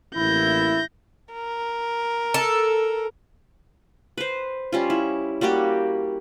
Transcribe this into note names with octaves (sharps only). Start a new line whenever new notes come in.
A1 A#3 E4 G6 A#6
A#4
A4
B4 C5
G3 C#4 F4
E4
G3 A#3 F#4 G4